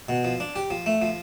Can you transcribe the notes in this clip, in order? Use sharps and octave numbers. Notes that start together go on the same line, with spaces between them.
B2
F3
D4
G4
F3
A3
F3